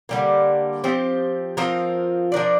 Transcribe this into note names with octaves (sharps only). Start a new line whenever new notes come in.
D3 G3 A#3
F3 C4 G4
F3 C4 F4 A#4
F3 D4 A#4 D5